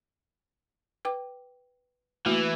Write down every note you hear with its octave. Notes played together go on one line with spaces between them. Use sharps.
B4 G5 D6
E3 A3 A#3 F#4